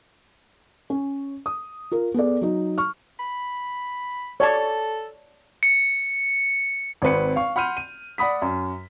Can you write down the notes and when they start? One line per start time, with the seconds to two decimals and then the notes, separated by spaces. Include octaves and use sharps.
0.90 C#4
1.46 D#6
1.91 F4 A#4
2.14 B3 G#4 A4 D5
2.41 F#3 D#4
2.78 C#6 F6
3.19 B5
4.40 A4 C#5 D5 A5
5.63 C#7
7.02 G#1 C4 B4 C#7
7.36 F5 C#6
7.56 F#5 B5 C6 F6 G6 D#7
7.77 D#7
8.18 D5 F#5 B5 D#6 B6
8.42 F#2